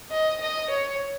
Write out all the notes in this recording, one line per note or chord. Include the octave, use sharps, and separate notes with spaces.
D#5
D#5
C#5